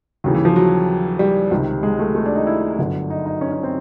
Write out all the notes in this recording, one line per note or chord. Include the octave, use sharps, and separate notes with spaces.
D#2 C#3 E3 F#3
E3
F3
F#3
G3
C#2 C3 D#3
G#3
A3
A3
D4
D#4
E4
G1 F#2 D3
D#4
D#4
C#4
C#4
C4